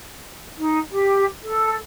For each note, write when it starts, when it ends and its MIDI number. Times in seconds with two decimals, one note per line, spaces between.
0.57 0.78 63
0.90 1.26 67
1.43 1.74 69